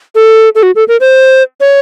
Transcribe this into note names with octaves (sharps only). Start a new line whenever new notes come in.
A4
A4
F#4
A4
A#4
C5
C#5